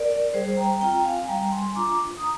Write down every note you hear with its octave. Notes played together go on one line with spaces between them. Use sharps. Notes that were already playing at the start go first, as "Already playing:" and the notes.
Already playing: A#4 D5
G3 G#4 C5
G5 A#5
C4 F4 G5 A#5
F5 G#5
G3 G5 A#5
G#5 C6
D4 F4 A#5 D6
D#6
A#5